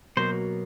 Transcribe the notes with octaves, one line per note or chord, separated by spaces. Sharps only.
B2 F#3 A#3 C5